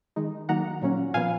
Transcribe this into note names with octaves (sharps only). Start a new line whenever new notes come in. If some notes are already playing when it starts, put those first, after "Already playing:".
D#3 G#3 D#4
D#3 F#3 A#3 D#4 F#5 A#5
A#2 F#3 A#3 C#4
A#2 F3 B3 F5 G#5